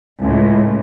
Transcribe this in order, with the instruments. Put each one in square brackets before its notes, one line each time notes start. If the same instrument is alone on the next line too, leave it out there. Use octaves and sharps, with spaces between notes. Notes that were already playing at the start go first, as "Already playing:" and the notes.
[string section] C#2 A2